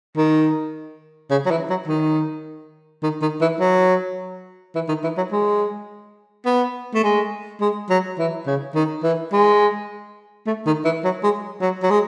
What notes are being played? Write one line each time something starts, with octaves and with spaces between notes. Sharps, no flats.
D#3
C#3
F#3
E3
F#3
D#3
D#3
D#3
E3
F#3
E3
D#3
E3
F#3
G#3
B3
A3
G#3
G#3
F#3
E3
C#3
D#3
E3
G#3
A3
D#3
E3
F#3
G#3
F#3
F#3
G#3